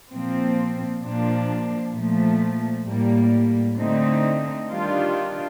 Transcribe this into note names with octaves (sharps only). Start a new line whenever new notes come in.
A#2 F3 C4
A#2 F3 A#3 D4
A#2 F3 A3
A2 G3 A#3
D3 A3 C4 D#4
D#3 G3 D4 F4